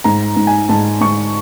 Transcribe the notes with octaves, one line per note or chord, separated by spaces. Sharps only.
G#2 A#5
G#2
G#5
G#2 A5
G#2 C#6